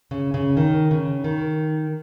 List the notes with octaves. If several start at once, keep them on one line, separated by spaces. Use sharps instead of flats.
C#3
C#3
D#3
C#3
D#3